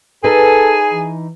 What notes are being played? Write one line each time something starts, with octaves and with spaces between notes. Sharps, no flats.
D#4 G#4 A4 B4 G#5
E3